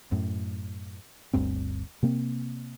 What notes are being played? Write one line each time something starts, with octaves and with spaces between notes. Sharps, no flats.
F#2 A2
G1 D2 G2 C4
C3 A#3 C4